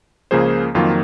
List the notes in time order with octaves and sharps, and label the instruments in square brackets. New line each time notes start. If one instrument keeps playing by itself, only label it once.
[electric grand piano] C#2 C#3 F3 A#3 G#4 C5
F2 D#3 F#3 A#3 F4